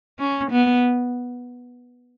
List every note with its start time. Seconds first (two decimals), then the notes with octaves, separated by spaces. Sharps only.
0.20 C#4
0.51 B3